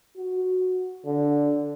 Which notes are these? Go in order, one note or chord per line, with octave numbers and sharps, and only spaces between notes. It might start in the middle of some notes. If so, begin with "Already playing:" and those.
F#4
D3